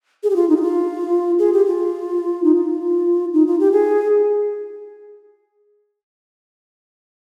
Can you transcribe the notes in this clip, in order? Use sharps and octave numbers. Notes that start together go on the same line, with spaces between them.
G#4
G4
F4
D#4
G4
F4
G#4
G4
F4
D#4
F4
D#4
F4
G4
G#4